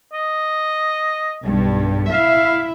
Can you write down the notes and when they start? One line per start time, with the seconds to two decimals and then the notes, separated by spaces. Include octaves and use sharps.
0.13 D#5
1.42 B1 G2
2.12 E4 E5 F5